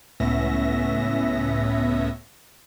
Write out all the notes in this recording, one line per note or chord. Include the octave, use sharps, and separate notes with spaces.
C#2 A2 B3 C#4 E5 A#6